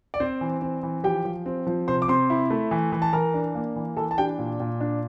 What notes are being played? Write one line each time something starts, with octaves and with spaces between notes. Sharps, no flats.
D5
C4 C5
E3
C4
E3
F3 G4 G5
F3
C4
F3
C3 C5 C6
D6
C3 C5 C6
E4
A3
E3
E3
A5
E3 A#4 A#5
D4
A#3
E3
E3 A4 A5
A5
D4 G4 G5
A#2
A#2
D4